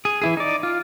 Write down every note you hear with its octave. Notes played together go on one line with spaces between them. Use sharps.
G#4
E3 E4 G#4
D#4 D5
F4